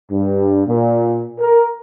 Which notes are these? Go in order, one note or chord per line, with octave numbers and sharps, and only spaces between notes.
G2
A#2
A#4